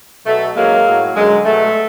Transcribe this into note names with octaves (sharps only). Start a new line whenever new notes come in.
B2 F#3 A3
F#2 D#3 F#3 G#3 A#3
A2 F#3
F#2 D3 F#3 G#3
B2 F#3 A3